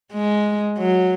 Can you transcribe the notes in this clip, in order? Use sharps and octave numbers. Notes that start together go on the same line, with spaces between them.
G#3
F#3